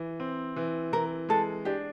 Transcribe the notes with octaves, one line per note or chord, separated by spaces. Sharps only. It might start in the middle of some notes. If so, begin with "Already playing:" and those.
Already playing: E3
C4
E3
E3 A#4
G#3 A4
D4 G4